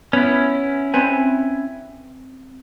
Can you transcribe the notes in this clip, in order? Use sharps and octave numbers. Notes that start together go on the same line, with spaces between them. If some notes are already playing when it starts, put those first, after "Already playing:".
B3 C#4 E4
C4 B4 G#5